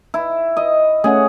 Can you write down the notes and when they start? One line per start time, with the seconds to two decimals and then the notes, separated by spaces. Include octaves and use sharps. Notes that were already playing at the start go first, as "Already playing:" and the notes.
0.14 E4
0.57 D#5
1.04 A3 C#4 G#4 F#5